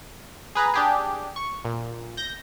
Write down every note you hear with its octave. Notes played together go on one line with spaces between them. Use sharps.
G#4 B4 A#5
D4 G4 G#4
C#6
A#2
G6 A#6